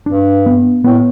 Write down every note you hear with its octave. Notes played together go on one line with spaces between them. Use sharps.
G2 D4
B3
A2 B3